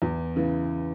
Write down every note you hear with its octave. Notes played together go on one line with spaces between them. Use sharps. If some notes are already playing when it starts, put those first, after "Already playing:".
E2
C#3 E3